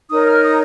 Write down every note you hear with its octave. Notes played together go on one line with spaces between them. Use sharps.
D#4 A#4 C#5 D#6
F6
D#6